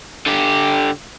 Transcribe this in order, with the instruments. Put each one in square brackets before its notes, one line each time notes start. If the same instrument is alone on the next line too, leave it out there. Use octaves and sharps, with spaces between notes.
[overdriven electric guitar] D3 G4